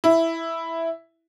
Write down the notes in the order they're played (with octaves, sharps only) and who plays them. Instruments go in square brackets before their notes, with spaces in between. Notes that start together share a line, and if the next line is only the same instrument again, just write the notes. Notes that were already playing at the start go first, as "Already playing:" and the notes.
[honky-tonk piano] E4